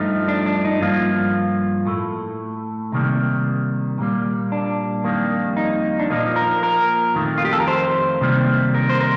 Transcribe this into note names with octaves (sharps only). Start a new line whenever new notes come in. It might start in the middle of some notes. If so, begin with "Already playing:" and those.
Already playing: G2 F3 A3 D#4
D4
D4
D#4
G2 F3 A#3 F4
A2 A3
C3 D#3 G3 A#3
A#2 G3 A#3
D4
F2 D#3 G3 A#3
D#4
D4
A#2 F3 A#3 D#4
A#4
A#4
F2 D#3 A3
F4
G4
A4
A#4
C5
C3 D#3 G3 A#3
A#4
C5
A#4